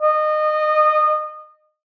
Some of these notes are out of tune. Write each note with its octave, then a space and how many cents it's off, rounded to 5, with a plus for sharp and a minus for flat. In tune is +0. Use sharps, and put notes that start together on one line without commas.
D#5 -25